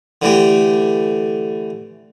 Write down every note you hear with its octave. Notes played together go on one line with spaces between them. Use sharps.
D3 E3 A3 G4